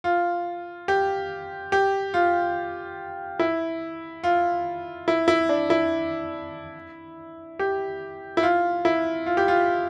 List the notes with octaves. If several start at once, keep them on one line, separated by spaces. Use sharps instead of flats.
F4
G4
G4
F4
E4
F4
E4
E4
D4
E4
G4
E4
F4
E4
F4
G4
F4